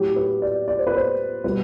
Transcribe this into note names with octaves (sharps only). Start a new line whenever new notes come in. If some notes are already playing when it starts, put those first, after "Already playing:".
Already playing: A2 F#3 G4
B4
D5
D5
C5
B4
C5
B2 G3 B4